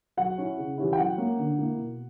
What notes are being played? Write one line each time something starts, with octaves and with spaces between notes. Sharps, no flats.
F#3 F#5
C#4 E4
C#3
E3 G3 C#4 E4
G5
F#3 F#5
A#3 C#4
D3
A#3 E4
B2